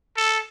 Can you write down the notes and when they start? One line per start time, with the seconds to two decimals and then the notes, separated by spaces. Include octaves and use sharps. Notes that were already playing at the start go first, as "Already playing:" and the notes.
0.17 A4